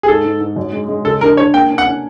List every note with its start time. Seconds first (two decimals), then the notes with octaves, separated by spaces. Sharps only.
0.03 G#4
0.08 G#2 A4
0.25 G#2
0.40 G#2
0.56 F#2
0.72 G#3
0.88 G#3
1.05 C#3 A4
1.21 D4 A#4
1.37 D4 C#5
1.54 A#3 G5
1.70 C#4
1.78 F#5
1.86 C#4